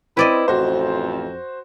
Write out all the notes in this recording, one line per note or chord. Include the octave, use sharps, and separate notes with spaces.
C4 E4 B4 D5 D#5
A1 F2 F#4 C5